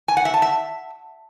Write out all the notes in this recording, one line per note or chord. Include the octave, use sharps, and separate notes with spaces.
G#5
F#5
E5
A5
E5